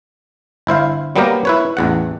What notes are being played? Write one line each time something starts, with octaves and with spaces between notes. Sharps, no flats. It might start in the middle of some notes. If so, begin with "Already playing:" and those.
G1 E4 C5 F5
F#3 G3 A#3 B3 G4 A#4
E4 B4 C#5
A1 E2 F#5